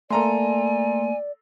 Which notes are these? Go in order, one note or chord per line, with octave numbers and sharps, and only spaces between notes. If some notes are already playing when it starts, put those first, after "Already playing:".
A3 A#3 A4 D5 G#5 A#5 C6